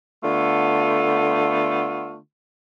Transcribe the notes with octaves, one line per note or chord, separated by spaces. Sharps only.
D3 A3 B3 F4